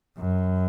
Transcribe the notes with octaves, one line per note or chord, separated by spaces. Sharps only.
F#2